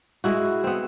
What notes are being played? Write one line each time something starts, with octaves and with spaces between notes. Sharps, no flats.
G#3 E4 F#4
B3 C4